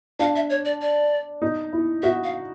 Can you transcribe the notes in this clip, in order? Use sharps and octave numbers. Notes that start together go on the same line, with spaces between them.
D4 F5
E5
C#5
D5
D5
D#4
E4
F#4 E5
F5